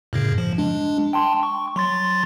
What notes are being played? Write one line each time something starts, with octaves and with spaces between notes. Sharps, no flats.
F#2 A2 C#3
F3
G#3 D4
G5 A5 C6
C#6
F#3 C6 A6